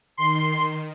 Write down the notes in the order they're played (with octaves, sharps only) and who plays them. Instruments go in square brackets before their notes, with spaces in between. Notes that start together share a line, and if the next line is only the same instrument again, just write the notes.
[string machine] D#3 [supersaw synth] C6